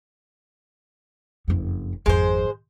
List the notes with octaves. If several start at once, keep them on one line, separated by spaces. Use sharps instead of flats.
F#1 F2
G#1 F2 G#3 C5